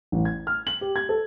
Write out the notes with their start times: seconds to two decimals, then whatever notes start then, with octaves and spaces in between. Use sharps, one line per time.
0.12 A1
0.25 G#6
0.47 F6
0.67 F#7
0.81 G4
0.96 G#6
1.09 A4